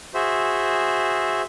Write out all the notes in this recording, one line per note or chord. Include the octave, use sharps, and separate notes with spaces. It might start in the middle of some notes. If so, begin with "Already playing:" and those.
F#4 G#4 C5 E5